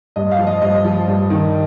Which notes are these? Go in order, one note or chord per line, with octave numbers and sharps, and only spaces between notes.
G2 D#5
F5
F3
D#5
G2 D#5
F3
G2
D#3